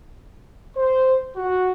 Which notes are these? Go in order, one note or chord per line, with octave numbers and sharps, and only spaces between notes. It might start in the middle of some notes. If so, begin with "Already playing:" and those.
C5
F#4